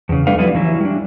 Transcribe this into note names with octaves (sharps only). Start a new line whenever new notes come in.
E2 C#3
G3 A3 D4 B4 F5
F3 G3 B3 E4 B4
E3 F#3 E4
G3 D4